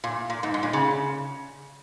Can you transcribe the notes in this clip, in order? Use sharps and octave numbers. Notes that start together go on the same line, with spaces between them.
A#2
A#2
G#2
G#2
A#2
C#3